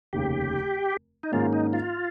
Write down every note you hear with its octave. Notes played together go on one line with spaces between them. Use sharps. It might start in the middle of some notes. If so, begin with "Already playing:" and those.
F1 D#2 C#3 G4
D#4
G#2 D#3 A#3 C#4 F4 G#4
D#4
F4